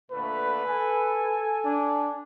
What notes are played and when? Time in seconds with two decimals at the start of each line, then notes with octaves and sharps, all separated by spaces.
0.11 A#2 D3 A3 B4
0.64 A4 G#5
1.65 D4